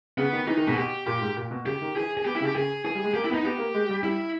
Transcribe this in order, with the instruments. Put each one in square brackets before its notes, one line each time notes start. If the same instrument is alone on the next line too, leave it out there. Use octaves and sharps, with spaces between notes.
[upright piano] C#3 [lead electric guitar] B3
[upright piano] D#3
[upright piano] E3 [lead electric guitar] D#4
[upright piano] D#3
[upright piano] B2 [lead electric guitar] G#4
[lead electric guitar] G4
[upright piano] A#2 [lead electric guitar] G4
[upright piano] G#2
A#2
B2
[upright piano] C#3 [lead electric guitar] G4
[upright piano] D#3
[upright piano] E3 [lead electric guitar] G#4
[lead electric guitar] G#4
[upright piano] B3 [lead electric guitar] G4
[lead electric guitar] E4
[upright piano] C#3
[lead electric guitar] G4
[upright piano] C#3 [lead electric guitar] G#4
[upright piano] E3 [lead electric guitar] G#4
[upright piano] G3
G#3
[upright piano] A#3 [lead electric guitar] G4
[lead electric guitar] E4
[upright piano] B3
[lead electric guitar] D#4
[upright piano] B3 [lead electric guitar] G4
[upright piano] A#3
G#3
G3
[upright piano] G3 [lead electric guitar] E4